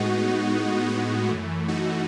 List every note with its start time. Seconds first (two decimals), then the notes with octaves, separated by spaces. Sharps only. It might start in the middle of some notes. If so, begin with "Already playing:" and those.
Already playing: A2 G#3 B3 D#4 F#4
0.89 D#4 F#4
1.29 F#2 E3 A3
1.68 D#4 F#4